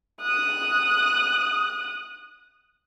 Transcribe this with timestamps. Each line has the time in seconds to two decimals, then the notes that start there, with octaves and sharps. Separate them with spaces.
0.21 D#6 F#6